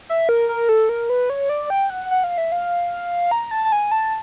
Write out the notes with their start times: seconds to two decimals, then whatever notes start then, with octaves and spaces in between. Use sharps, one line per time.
0.09 E5
0.29 A#4
0.49 A#4
0.69 A4
0.89 A#4
1.10 B4
1.30 C#5
1.49 D5
1.70 G5
1.90 F#5
2.11 F#5
2.24 F5
2.38 E5
2.52 F5
3.31 A#5
3.51 A5
3.65 A5
3.72 G#5
3.92 A5